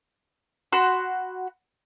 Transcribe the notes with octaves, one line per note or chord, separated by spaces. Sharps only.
F#4 B5 C6